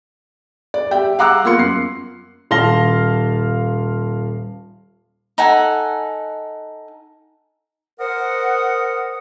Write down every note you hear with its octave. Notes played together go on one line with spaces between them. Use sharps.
D5
G4 E5 G5
F5 F#5 A#5 D6 E6 F#6
A#3 B3 F4 A#4 C6 C#7
F#2 C7
D#1 F5 A5 C6 A#6 G7
D#4 A4 F#5 G#5
A#4 C5 D#5 F#5